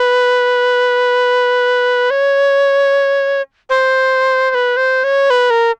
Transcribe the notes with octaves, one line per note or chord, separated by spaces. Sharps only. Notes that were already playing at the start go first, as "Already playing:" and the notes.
Already playing: B4
C#5
C5
C5
B4
C5
C#5
B4
A#4